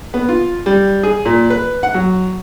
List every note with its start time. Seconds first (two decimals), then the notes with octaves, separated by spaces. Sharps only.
0.14 B3
0.29 F4
0.66 G3
1.03 G#4
1.25 A#2
1.50 B4
1.83 F#5
1.94 F#3